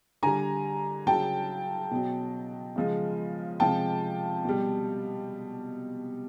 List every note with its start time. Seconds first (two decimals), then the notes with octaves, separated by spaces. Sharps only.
0.23 D3 G3 G#5 A#5
1.07 C#3 F#3 G5 A5
1.91 B2 F#3
2.76 C#3 F3 G#3
3.59 C3 F3 G#3 G5 A5
4.45 B2 G3